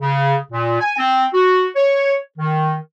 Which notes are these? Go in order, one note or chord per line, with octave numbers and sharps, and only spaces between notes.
C#3
A#2
G#5
C4
F#4
C#5
D#3